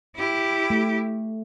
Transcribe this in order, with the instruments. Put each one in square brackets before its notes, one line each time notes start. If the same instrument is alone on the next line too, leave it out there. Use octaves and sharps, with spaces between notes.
[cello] E4 G4
[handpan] A3